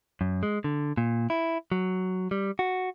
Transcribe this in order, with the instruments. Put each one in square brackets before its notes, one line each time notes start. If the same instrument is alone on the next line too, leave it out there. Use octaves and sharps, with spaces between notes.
[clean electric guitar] F#2
G#3
D3
A#2
E4
F#3
G3
F#4